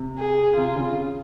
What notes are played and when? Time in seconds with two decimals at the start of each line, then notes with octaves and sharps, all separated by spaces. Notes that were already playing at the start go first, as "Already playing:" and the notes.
Already playing: C3
0.18 G#4
0.57 C3 F4
0.76 C#3